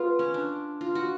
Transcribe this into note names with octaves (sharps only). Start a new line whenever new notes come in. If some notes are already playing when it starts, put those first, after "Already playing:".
Already playing: G#3 B3 F4
C#4
D4
F4
F#4